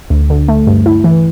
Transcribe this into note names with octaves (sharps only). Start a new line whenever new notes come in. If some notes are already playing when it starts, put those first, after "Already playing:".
D2
D3
A3
G2
E4
E3